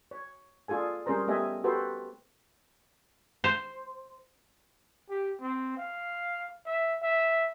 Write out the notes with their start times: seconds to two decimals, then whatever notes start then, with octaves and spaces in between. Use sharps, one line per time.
0.11 C#5
0.68 D4 F4 G#4 A4 G#5
1.06 G3 C#4 G#4 A#4 C5 A#5
1.28 A3 B3 G4 D#5 E5 G#5
1.64 F#4 G4 A4 B4 C5
3.44 C5
5.10 G4
5.41 C4
5.77 F5
6.65 E5
7.02 E5